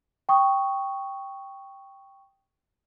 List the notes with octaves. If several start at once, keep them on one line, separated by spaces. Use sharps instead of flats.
G5 C#6 D#6